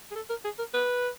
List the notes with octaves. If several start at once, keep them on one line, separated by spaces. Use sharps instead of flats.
G#4
A4
A#4
G#4
A#4
B4